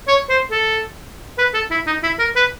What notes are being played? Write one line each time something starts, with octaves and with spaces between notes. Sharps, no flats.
C#5
C5
A4
B4
A4
E4
D#4
E4
A#4
B4